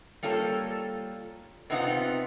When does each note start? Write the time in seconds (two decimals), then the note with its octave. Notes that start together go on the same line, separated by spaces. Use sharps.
0.23 G3 A#3 F4 A4 C#5
1.70 C3 B3 C4 D#4 F4 F#5